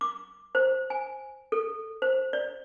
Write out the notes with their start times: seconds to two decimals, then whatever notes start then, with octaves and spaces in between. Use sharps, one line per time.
0.01 D6
0.55 C5
0.90 G#5
1.52 A4
2.02 C5
2.33 D5